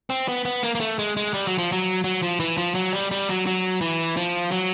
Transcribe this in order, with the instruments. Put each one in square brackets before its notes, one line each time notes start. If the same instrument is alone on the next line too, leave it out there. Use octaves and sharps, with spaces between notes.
[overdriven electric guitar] C4
B3
B3
A#3
A#3
A3
G#3
G#3
G3
F#3
F3
F#3
F#3
F3
E3
F3
F#3
G3
G3
F#3
F#3
E3
F3
F#3